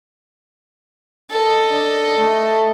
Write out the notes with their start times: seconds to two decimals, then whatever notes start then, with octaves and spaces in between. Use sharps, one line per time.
1.31 A4 D#5
1.71 D4
2.17 A3